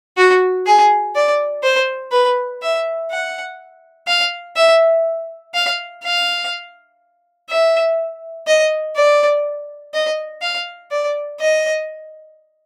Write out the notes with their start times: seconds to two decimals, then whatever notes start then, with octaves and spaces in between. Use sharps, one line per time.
0.17 F#4
0.66 G#4
1.15 D5
1.63 C5
2.12 B4
2.62 E5
3.11 F#5
4.07 F5
4.56 E5
5.54 F5
6.03 F5
7.49 E5
8.47 D#5
8.96 D5
9.93 D#5
10.42 F5
10.91 D5
11.39 D#5